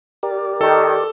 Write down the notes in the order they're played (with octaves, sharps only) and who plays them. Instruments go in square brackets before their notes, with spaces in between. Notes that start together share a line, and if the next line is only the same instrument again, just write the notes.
[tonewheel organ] G4 A#4 D5
[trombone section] D#3 [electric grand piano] A4